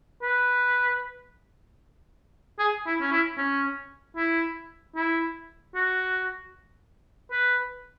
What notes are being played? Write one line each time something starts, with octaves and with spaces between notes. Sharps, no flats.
B4
G#4
E4
C#4
E4
C#4
E4
E4
F#4
B4